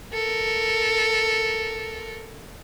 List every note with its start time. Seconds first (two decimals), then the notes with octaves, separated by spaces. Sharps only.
0.13 A4 A#4